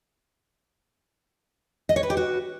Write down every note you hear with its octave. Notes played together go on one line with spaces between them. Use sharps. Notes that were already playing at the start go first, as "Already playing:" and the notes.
D#5
C#5
B4
G4
F#4